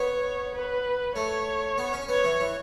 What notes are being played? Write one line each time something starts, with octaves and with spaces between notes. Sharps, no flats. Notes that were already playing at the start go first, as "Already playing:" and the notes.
Already playing: B3 C#5
B4
A3 C#5
B3
C#4
B3 C#5
E3
E3